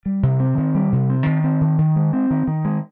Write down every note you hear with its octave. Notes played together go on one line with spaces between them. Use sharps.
G3
C3
C4
D#3
G3
C3
C4
D#3
C4
D#3
D#3
G#3
C4
D#3
D#3
G#3